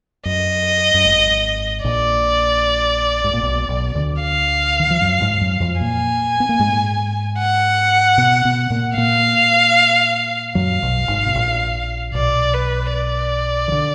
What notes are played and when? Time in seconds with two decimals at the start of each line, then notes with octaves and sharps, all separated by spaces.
0.25 F#2 D#5
0.94 F#2
1.05 G#1 G#2
1.84 A#1 A#2 D5
3.24 G#2
3.34 A#2
3.43 B1 B2
3.69 B1 B2
3.95 D2 D3
4.23 F5
4.80 D#3
4.90 F3
5.01 F#2 F#3
5.21 G#2 G#3
5.41 F#2 F#3
5.60 F2 F3
5.81 A#2 A#3 G#5
6.40 B3
6.49 A#3
6.59 G#2 G#3
7.39 F#5
8.18 B2 B3
8.45 B2 B3
8.70 A#2 A#3
8.97 A#2 A#3 F5
10.55 F#2 F#3 F5
10.82 B1 B2
11.08 G#1 G#2
11.26 B2
11.35 A#1 A#2
12.15 B1 B2 D5
12.54 B4
12.93 D5
13.68 D#3
13.72 D3